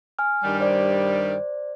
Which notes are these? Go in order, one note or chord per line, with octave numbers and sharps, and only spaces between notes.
G#5 F6
G2 D#3 G3
C5 D5